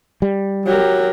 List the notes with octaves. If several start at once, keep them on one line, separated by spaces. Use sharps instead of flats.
G3
F#3 G4 A#4